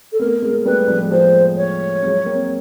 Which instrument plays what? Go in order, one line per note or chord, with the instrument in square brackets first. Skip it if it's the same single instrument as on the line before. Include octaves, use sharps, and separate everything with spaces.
[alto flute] A4
[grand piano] A3 B3 [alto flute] A#4
[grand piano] G#3 A#3
[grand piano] G3 A3 [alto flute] B4
[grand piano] F3 G3
G#3
[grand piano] F3 G3 [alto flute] C5
[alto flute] C#5
[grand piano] F#3 G#3
A#3 C4